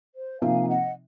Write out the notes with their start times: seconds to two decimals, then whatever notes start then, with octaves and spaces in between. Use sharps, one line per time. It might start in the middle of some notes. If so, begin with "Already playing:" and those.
0.14 C5
0.41 C3 F3 A#3 D#4 F5 G#5
0.62 G#5
0.69 D#5 F#5